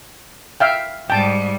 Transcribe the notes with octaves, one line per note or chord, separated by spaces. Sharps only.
E5 F5 G5
G#2 G3 G5 A5